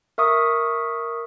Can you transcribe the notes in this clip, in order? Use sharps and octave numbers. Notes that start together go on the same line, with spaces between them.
A#4 E5 C#6 D#6